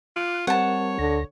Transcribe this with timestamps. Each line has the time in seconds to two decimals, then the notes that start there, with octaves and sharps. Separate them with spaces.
0.16 F4 D6 F#6
0.47 G3 C4 A#4 C#5 F#5 A5
0.99 D2 D3 A#6